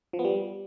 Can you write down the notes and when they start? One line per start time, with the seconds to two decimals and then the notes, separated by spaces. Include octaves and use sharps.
0.13 F3
0.19 B3
0.25 G3